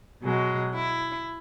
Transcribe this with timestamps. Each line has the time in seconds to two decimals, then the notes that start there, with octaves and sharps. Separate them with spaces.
0.23 B2 F#3 G#3
0.74 E4